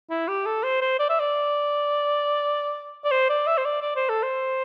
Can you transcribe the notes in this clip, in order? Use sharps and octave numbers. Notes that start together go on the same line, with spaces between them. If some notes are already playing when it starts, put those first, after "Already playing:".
E4
G4
A4
C5
C5
D5
E5
D5
D5
C5
D5
E5
C5
D5
D5
C5
A4
C5